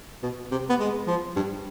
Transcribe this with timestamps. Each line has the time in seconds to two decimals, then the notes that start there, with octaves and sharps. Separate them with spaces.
0.23 B2
0.51 C3
0.69 B3
0.80 G#3
1.07 F3
1.36 G2